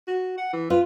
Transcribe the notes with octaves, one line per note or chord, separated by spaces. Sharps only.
F#4
F#5
E3
F4 B4